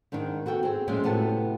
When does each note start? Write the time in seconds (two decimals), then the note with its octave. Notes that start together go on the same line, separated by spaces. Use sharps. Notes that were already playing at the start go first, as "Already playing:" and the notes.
0.12 G#2 D#3 D4 D#4
0.46 B3 F#4 A4 G5
0.63 C4 G#4
0.88 A#2 F3 G#3 A3 C4 C#4
1.03 A2 C3 B3 F#4 A4 A5